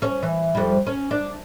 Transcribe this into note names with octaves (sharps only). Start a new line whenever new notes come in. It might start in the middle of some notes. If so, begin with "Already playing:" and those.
C#4 C#5
E3
F2 G3
C#4
D4